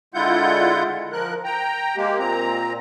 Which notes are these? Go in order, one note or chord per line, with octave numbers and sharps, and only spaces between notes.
D3 G#3 E4 F4 F#5 G6
F3 A#4 F#6
G5 A#5
G#3 A#3 G4
A#2 C4 A#5